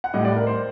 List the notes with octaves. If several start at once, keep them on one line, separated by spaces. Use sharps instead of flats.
F#5
A2 G3 D#5
D5
A#4
C5